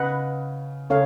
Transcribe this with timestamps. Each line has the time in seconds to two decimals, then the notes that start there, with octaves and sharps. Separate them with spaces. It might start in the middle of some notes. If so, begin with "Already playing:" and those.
Already playing: C#3 B4 D#5 F#5
0.90 C#3 A4 C#5 F5